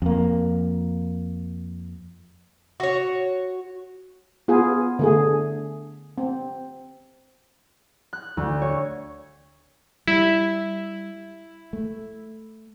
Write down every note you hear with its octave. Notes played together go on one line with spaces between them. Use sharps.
F2 A#3
F#4 C#5
B3 F4 G#4
D3 A3 G#4
C4
F#6
D2
C#5
G3 E4
A3